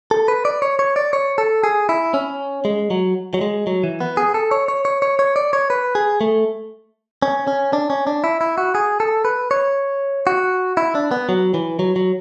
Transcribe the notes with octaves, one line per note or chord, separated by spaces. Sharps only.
A4
B4
D5
C#5
C#5
D5
C#5
A4
G#4
E4
C#4
G#3
F#3
F#3
G#3
F#3
E3
B3
G#4
A4
C#5
C#5
C#5
C#5
C#5
D5
C#5
B4
G#4
A3
C#4
C#4
D4
C#4
D4
E4
E4
F#4
G#4
A4
B4
C#5
F#4
E4
D4
B3
F#3
E3
F#3
F#3